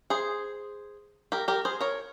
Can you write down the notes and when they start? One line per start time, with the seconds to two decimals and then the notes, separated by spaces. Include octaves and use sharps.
0.10 G#4 C5
1.32 G4 A#4
1.48 G4 A#4
1.65 G#4 C5
1.81 A#4 C#5